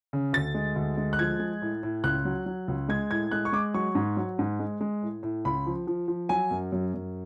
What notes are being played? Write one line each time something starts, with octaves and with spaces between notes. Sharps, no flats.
C#3
D2 A6
G#3
D2
G#3
F#6
F3 G#6
G#3
A2
A2
C#2 F#6
F#3
F#3
C#2
G#3 G#6
A2 G#6
G#3 F#6
C#6
G#3 D6
F#3 C#6
G#2
F#3
G#2
G#3
G#3
A2
A2
C#2 B5
F3
F3
F3
F#3 G#5
F#2
F#2
F#2